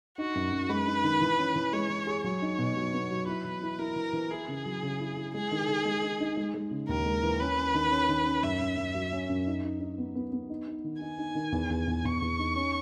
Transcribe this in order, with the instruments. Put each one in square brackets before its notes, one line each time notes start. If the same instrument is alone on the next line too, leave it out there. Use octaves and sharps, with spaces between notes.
[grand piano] D#4 [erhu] F#4
[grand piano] F#2
F#2
[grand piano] G#3 [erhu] B4
[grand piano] D#4
D#3
E3
C#4
E3
[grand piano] G#3 [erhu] C#5
[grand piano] E3
G#4
[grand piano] F#3 [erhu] C#5
[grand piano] D#4
B2
F#3
B3
F#3
[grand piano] E4 [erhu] B4
[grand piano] E3
E4
[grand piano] E4 [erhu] A#4
[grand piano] E3
E3
[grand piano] E4 [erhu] G#4
[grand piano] C#3
F#3
C#3
E4
E4
[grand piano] G#3 [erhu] G#4
[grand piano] D#3
D#3
G#3
D#4
D#4
G#3
G#3
C#3
[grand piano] D#2 [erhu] A#4
[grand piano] G#3
E3
[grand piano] C#4 [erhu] B4
[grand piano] C#4
D#3
C#4
D#3
C#4
[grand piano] F#2 [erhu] E5
[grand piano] F#2
F#2
F#3
C#4
F#2
D#4
D#4
D#4
B3
B3
B3
D#4
D#4
D#3
[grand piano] D#4 [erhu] G#5
[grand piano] D#4
D#3
E2
E2
E2
[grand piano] E2 [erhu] C#6
[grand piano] E2
D#4
C#4